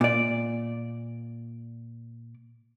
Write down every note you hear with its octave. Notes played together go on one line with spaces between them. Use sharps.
A#2 D5